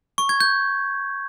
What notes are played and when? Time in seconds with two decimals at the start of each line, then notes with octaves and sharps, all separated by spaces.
0.18 C#6
0.29 G#6
0.40 G6